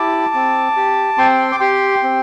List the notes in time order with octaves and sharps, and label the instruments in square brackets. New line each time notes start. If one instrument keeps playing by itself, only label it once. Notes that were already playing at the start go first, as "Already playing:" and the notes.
Already playing: [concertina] E4 G4 A5 D6
C4
G4
C4 G5 C6
D6
G4 G5 C6
C4